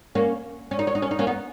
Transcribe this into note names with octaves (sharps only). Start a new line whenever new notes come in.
A#3 C#4
C#4
D#4
C#4
D#4
C#4
D#4
A#3 C#4
B3 D#4